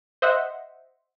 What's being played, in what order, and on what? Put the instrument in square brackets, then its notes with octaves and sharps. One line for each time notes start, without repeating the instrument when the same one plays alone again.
[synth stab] C5 D#5 E5 F#5